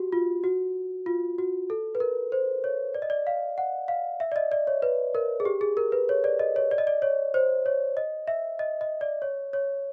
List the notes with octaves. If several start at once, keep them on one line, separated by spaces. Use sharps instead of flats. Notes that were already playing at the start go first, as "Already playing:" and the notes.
Already playing: F#4 G4
F4
F#4
F4
F#4
A4
B4
A#4
C5
C#5
D5
D#5
D5
F5
F#5
F5
E5
D5
D#5
D5
C#5
B4
A#4
G#4
G4
G#4
A#4
B4
C#5
D5
D#5
C#5
D5
D#5
D5
C#5
C5
C#5
D#5
E5
D#5
D#5
D5
C#5
C#5